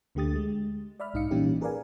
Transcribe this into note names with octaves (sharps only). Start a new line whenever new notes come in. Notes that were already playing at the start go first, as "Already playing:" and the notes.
D2 D3 A3 G4 D#6 A6
G#3
D5 E5 B5 F6
B1 G#2 D#4 D#5 F5 C#7
A#2 E3 G3 C#4 D#4 G4
G#4 A#4 B4 D5 F5 G#5